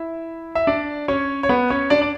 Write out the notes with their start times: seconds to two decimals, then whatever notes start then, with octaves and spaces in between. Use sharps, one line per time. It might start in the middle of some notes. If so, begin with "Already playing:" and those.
Already playing: E4 E5
0.55 E5
0.67 D4 D5
1.08 C#4 C#5
1.43 C#5
1.49 B3 B4
1.70 C#4 C#5
1.90 D4 D5
2.02 D5